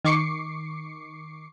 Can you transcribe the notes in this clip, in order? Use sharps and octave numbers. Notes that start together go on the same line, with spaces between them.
D#3 C#6 D6 C7 C#7